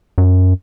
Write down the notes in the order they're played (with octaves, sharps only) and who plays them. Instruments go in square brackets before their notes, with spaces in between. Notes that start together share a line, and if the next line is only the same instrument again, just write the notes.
[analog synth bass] F#2